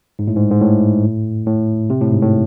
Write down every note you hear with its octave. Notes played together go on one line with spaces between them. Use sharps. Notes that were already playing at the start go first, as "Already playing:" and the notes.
G#2
A2
G#2
G#2
A2
A2
C3
A2
G#2
A2